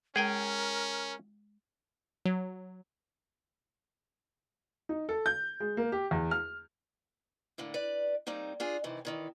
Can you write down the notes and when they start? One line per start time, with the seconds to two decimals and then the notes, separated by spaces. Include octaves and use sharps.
0.16 G#3 C#4 G#4 A#4 G5 G#5
2.25 F#3
4.89 D#4
5.09 A4
5.26 G6
5.60 G#3
5.77 A#3
5.92 G4
6.11 E2
6.31 F6
7.58 A2 D3 A#3
7.74 B4 D5
8.27 G3 A#3 C4 D#4
8.60 D4 F4 G#4
8.84 C3 D#3 E3
9.05 A#2 D#3 E3